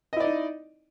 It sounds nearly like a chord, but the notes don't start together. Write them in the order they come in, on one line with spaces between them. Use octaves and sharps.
D#5 E4 D5 D#4